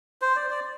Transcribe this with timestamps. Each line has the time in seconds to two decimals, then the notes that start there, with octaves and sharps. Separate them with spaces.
0.22 C5
0.36 D5
0.50 D5